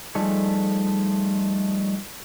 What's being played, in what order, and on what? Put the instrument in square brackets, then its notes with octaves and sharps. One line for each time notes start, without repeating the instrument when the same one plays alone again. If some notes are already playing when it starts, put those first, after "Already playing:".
[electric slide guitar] F3 G3 A3 D#4 G#4 A4